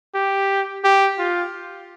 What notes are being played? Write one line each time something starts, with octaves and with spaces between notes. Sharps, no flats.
G4
G4
F4